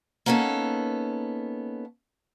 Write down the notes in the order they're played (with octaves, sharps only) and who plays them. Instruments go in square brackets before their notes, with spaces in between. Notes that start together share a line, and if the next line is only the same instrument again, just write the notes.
[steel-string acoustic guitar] A#3 B3 C#4 D#4 A4